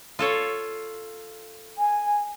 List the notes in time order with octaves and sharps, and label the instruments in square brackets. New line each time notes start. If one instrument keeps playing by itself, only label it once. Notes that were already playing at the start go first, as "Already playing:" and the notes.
[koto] F4 A4 C#5
[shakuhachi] G#5